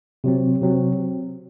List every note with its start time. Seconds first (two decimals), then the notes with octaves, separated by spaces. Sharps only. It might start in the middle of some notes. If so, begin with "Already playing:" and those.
0.24 C3 F#3 C4
0.61 C3 F#3 C4